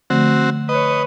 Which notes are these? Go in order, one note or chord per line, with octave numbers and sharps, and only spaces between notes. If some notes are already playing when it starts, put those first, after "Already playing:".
D3 F3 A3 C4 F#4
B4 C#5 D#5